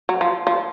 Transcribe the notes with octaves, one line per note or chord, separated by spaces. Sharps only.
F#3
F3
F3